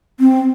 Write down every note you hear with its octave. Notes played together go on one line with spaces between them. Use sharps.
C4